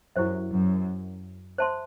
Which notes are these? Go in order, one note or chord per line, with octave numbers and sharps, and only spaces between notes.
F#2 F#3 E4 G4 C5 E5
F#2 F#3
C5 E5 A5 C6